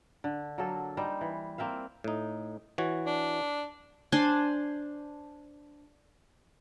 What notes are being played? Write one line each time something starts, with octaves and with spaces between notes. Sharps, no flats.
D3
F#3 A#3 A4
G3 D#4 C5
E3
A#3 C4 E5 F5
A2 D#4
E3 F#4 C#5
D4
D4 C5 G#5 A5